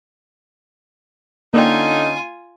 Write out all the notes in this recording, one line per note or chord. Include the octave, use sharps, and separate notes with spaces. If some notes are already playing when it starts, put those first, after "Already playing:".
D3 A#3 C#4 D#4 F4 D5 G5 G#5